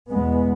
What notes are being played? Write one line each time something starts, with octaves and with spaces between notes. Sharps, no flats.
E2 B2 G#3 B3